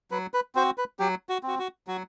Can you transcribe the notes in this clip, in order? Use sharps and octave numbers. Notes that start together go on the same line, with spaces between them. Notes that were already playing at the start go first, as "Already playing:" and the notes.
F#3 B4
B4
C4 F#4 C5
B4
F#3 G4
F#4
C4 F#4
F#4
F#3 F#4